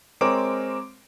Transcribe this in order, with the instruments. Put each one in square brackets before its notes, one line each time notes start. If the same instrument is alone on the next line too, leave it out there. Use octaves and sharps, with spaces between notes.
[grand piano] G#3 C4 A#4 C#5 D6 D7